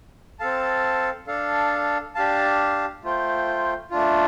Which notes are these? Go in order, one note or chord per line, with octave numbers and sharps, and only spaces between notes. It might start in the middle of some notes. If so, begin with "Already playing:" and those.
C4 A4 F5 A5
D4 A4 F5
D4 G4 F5 A5
A3 F4 C5 G5
A3 D4 F4